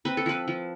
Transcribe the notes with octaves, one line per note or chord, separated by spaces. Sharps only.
C4 B4
A4
F3 B4
F3